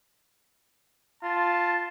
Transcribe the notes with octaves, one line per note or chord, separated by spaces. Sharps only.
F4 A5